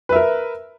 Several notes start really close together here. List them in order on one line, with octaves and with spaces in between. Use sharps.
B4 E5 A#4